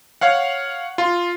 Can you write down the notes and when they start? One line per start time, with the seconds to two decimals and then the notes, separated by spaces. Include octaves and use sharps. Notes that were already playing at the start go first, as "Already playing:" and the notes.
0.21 C#5 F5 F#5
0.98 F4 C6